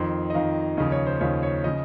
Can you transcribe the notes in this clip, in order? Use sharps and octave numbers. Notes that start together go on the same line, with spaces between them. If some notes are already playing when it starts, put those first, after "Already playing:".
Already playing: F2 D#3 C6
D#5
F2 D#3 F5
D#2 C#3 F3 D#5
C#5
C5
D#2 C#3 F3 C#5
C#5
C#3 F3 D#5